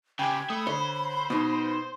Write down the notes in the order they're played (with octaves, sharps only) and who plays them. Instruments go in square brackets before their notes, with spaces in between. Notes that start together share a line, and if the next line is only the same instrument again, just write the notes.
[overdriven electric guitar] C#3 G4 [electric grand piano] G5 G#5 G#6 [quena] B5
[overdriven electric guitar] A3 [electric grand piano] D#6
[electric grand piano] D3 [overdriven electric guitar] C5 [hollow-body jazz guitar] C#5
[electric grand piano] B2 [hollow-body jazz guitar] B3 D#4